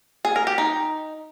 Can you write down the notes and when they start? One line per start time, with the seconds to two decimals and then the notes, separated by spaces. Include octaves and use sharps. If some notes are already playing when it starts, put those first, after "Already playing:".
0.25 G#4
0.36 A#4
0.47 G4
0.58 D#4